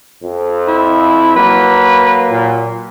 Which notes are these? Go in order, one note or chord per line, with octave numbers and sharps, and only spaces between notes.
F2
E4
F#3 A#3 B4
A#2